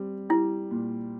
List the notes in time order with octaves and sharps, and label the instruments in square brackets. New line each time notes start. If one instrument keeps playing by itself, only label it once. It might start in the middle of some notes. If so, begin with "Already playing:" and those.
Already playing: [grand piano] G3 C4
[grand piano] G3 [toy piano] E4
[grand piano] A#2